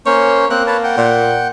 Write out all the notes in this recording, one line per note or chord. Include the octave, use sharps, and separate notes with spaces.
A#3 C#4 C5 C#5
A#3 C4 F#6
B4 C#5 A5
F#5 G5
A#2